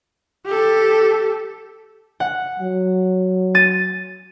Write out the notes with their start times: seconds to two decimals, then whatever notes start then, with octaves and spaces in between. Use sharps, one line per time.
0.45 G4 A4
2.20 F#5
2.59 F#3
3.55 A6 D#7